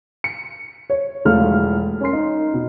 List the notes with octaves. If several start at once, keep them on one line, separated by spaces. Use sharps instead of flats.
C#7
C#5
E1 F3 A3 F5 F6
C#4 A#4 C6 C7
D#4
B2